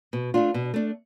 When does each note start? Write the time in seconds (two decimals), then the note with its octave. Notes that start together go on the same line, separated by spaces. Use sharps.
0.13 B2
0.34 A3 D4 F4
0.54 B2
0.74 A3 D4